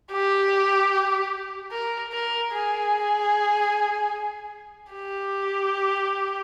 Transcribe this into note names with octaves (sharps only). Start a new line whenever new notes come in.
G4
A#4
A#4
G#4
G4